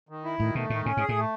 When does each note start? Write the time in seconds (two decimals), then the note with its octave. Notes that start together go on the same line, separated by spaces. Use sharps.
0.09 D#3
0.24 E4
0.39 A2 D#3
0.55 B2 A3
0.70 A2 D#3
0.85 A2 C#4
0.97 G#2 G#4
1.09 A2
1.16 A3